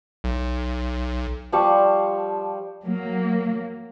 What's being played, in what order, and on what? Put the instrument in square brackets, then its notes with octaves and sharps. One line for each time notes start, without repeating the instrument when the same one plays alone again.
[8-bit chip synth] B1
[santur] F3 G3 A5 C#6
[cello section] F#3 A#3